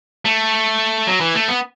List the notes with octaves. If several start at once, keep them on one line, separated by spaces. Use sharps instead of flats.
A3
F#3
E3
A3
B3